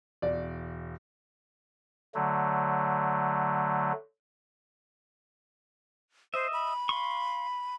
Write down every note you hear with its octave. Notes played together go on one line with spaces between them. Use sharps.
E1 D5
D3 F#3 A3
C5 D#5 E5
B5
F5 C6 C#6